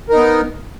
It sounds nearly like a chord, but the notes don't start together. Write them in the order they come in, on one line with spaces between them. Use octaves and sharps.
A#4 D#4 B3